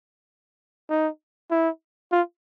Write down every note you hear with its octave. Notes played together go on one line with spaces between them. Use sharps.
D#4
E4
F4